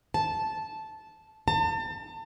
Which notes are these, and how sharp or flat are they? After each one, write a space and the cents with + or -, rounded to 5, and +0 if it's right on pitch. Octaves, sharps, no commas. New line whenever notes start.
A5 -10
A5 +35